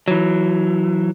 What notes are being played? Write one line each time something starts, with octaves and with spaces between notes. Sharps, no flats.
E3 F#3